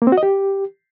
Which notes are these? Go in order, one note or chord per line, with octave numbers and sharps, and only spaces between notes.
A#3
C4
F#4
D#5
G4